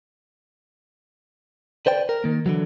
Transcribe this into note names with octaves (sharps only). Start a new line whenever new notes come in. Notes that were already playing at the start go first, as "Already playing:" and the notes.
B4 C5 D5 G5
A#4
D#3 A#3
D3 E3 F#3